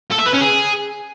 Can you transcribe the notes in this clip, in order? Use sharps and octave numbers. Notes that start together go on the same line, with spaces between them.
A4
E5
B4
C#4
G#4